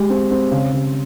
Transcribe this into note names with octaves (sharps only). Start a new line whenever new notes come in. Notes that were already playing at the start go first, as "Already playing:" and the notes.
Already playing: G#3 G4
C4
C4
C#3
C#3